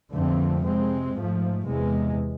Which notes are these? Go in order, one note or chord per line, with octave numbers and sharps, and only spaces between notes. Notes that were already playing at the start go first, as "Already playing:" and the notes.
F2 D3 A3 C4
C3 G#3 C4
G#2 F3 A3
E2 C3 G#3